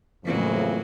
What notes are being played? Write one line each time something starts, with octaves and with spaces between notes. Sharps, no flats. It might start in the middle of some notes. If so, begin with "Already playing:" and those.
F2 A2 C#3 E3 F#3 A#3